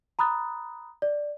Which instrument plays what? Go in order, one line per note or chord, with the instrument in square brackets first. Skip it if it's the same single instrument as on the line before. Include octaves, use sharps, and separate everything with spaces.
[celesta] A#5 B5 D#6 F#6 A6
D5